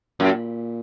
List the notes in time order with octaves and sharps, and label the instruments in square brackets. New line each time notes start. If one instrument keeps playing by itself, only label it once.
[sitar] F#2 [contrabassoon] A#2